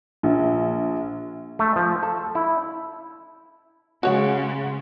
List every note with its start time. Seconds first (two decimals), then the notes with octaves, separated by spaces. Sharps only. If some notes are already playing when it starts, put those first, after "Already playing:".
0.23 A#1
1.59 A3
1.76 F3
2.03 A4
2.35 E4
4.03 C#3 G#3 F#4 C#5 F#5